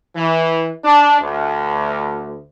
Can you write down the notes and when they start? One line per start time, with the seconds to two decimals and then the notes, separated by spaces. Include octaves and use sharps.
0.16 E3
0.84 D4
1.21 D2